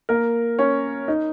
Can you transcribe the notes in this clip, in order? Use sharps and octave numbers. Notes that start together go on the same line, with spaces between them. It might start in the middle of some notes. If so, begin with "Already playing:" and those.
A#3 A#4
C#4 C#5
D#4 D#5